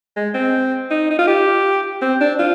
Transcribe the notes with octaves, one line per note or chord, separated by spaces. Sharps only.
G#3
C4
D#4
D#4
F4
G4
C4
D4
F4